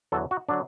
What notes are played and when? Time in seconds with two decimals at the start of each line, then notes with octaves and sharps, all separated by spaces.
0.12 E2 D3 F#3 A4
0.31 F#4
0.49 D3 F#3 D4